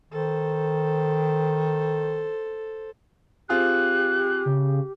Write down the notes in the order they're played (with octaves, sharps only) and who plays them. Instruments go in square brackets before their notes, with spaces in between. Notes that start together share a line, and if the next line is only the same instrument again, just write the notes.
[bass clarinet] D#3 [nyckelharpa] A4 C5
[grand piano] C4 F4 G#4 [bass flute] G4 [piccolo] F#6
[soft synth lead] C#3